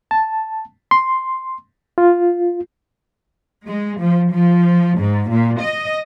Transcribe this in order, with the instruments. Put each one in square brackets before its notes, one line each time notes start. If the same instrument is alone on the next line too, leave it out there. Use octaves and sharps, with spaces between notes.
[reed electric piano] A5
C6
F4
[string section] G#3
F3
F3
G#2
A#2
D#5